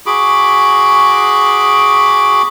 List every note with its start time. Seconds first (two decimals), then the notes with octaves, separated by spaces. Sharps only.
0.06 F#4 G#4 B5 D6